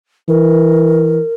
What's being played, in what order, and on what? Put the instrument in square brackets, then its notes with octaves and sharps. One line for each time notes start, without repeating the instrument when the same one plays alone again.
[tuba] E3 [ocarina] A#4